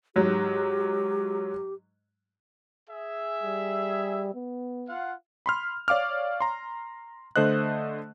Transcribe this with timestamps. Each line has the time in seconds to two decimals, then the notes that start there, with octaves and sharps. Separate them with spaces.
0.16 G#2 F#3 G4
2.89 G#4 E5
3.43 G3
4.34 B3
4.89 F4 F5 F#5
5.46 B5 C6 F6
5.88 C#5 D5 F5 D6 F6
6.41 A#5 C6
7.36 D3 A3 C5 D#5 F#6